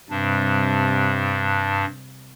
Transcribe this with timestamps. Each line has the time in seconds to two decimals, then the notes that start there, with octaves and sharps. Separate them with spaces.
0.10 G2 C3 G3 D4